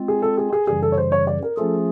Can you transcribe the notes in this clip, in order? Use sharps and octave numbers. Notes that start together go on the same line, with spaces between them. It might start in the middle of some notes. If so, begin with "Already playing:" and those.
Already playing: G#3 C4 F4
G#4
A4
G#4
G#4
F#2 C#3 E3 G3 G#4
A4
C#5
C5
C#5
D5
A#4
F3 A3 C#4 F4 G#4 A4